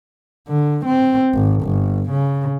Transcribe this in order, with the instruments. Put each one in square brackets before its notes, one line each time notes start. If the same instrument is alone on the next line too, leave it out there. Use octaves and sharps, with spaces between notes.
[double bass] D3
C4
G#1
G1
C#3